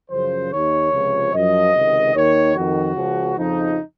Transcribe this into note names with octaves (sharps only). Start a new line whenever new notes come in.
F#2 C#3 F3 C5
D#2 D#3 C#5
C#2 C3 F3
F#2 F3 D#5
C#2 C3 D#3
D#2 D#3 C#5
F2 D#3 F#4
C#2 C#3 F3
F2 C#3 F3 D#4